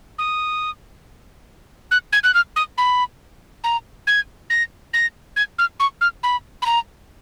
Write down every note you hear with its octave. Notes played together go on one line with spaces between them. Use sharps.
D#6
F#6
G#6
F#6
F6
D#6
B5
A#5
G#6
A#6
A#6
G#6
F6
C#6
F6
B5
B5
A#5